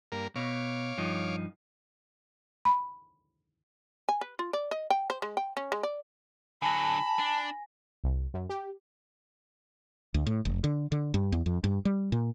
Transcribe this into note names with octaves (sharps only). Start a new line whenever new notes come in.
G2 A#3 A#4
B2 C#5 F5 D6
G2 F3 D#4
B5
G#5
B4
F4
D5
D#5
G5
C5
G#3
G5
C#4
G#3
D5
D3 F#3 G#5 A5 B5 A#6
D4
C2
F#2
G4
D2
A2
F1
D3
D3
G2
E2
F2
G2
G3
A#2